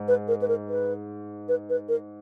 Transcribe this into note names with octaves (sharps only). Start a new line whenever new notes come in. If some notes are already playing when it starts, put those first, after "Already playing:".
Already playing: G#2
B4
A#4
B4
A#4
B4
B4
B4
A#4